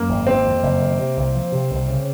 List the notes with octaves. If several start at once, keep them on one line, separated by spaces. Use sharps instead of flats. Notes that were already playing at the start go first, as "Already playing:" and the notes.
Already playing: F#2 A#3
G#1
D#3 C4
F2
F#1
D#3
C3
C2
F3
C3
C2
C#3